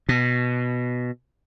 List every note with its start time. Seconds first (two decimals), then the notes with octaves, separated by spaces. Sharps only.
0.09 B2